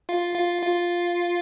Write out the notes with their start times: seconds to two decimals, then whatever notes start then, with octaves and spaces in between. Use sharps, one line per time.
0.09 F4 F5
0.35 F4 F5
0.62 F4 F5